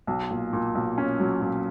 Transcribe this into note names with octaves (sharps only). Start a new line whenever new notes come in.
B1
A#2
A#2
B1
C#4
F#3
A#2